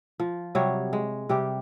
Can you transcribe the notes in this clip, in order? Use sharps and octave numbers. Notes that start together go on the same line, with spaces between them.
F3
C3 F#3 G3 C#5
G#3
C3 G3 G4